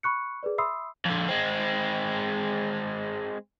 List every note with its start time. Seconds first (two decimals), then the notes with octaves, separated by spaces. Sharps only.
0.03 B5 C#6 F#6 C#7
0.43 G#4 A#4 B4 D5
0.58 E5 B5 C6 D#6 E6 C7
1.05 F2 D3
1.29 G#3 C4